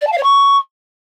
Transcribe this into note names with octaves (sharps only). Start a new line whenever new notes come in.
D5
A5
F5
C#5
C#6